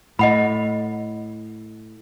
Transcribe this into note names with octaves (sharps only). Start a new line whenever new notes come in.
A2 D#5 F#5 B5